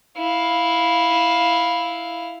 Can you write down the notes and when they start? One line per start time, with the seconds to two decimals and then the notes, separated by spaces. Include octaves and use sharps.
0.17 E4 F5